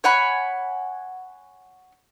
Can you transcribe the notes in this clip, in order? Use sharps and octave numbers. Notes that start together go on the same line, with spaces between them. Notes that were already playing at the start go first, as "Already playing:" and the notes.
C#5 F#5 G#5 B5